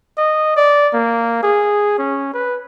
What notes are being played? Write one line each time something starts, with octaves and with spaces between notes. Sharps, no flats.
D#5
D5
A#3
G#4
C#4
B4